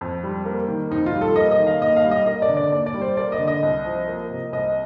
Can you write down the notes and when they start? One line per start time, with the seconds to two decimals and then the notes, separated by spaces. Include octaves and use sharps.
0.01 F2
0.23 G3
0.45 A#3
0.68 D#3
0.90 F2 D#4
1.06 F4
1.13 G3
1.21 A4
1.36 A#3 D#5
1.51 D#5
1.58 D#3
1.67 F5
1.82 D#2 D#5
1.96 F5
2.04 G3
2.11 D#5
2.26 A#3 D#5
2.42 D5
2.49 D3
2.57 D5
2.71 D#2 D5
2.86 D5
2.94 G3
3.01 C5
3.17 A#3 D5
3.32 D#5
3.39 D3
3.48 D#5
3.63 C2
3.85 F3
4.07 A#3
4.30 C3
4.53 C2 D#5